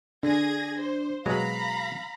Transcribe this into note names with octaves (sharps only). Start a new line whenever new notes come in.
D3 D4 G#4 G#6 A#6
C5
B2 F#3 G#3 F5 A#5 B5 A#6